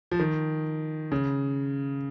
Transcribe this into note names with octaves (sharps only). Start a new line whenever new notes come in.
F3
D#3
C#3